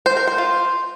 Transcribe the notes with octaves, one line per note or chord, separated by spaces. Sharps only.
C5
A#4
C5
F4